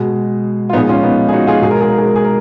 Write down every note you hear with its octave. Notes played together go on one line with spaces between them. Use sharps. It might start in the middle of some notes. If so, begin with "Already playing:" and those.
Already playing: B2 G#3
F4
A#2 F3 G#3 B3 D#4
C#4 F4
B3 D#4
G#4
D#4 F#4
F4 G#4
B2 G#3 G#4
A#4
G#4
A#4
G#4
A#4
G#4
A#4